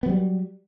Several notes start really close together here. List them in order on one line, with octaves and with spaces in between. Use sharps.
B3 F#3 G3